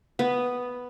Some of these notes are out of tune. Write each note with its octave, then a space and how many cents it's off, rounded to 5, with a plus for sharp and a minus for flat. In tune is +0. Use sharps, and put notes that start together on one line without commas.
B3 +0 B4 +0